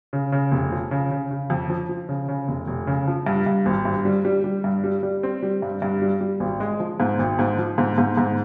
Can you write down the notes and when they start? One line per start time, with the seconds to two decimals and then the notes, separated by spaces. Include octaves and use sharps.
0.13 C#3
0.32 C#3
0.52 F1
0.72 F3
0.91 C#3
1.11 C#3
1.31 C#3
1.50 F2
1.70 F3
1.89 F3
2.09 C#3
2.28 C#3
2.48 F1
2.68 F1
2.87 C#3
3.08 F3
3.27 G2
3.46 G2
3.66 G#1
3.85 G2
4.05 G3
4.25 G3
4.44 G3
4.64 G2
4.84 G3
5.03 G3
5.23 C4
5.42 G3
5.62 G2
5.82 G2
6.02 G3
6.21 G3
6.40 G#1
6.60 G#3
6.80 F3
7.00 G#2
7.19 G#1
7.39 G#2
7.58 F3
7.78 G#2
7.98 G#2
8.17 G#2